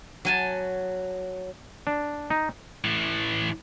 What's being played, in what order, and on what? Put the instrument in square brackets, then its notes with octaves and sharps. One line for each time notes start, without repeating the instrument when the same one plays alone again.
[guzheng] F#3 G#5 A5
[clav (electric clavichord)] D4
D#4
[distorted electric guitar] A2 E3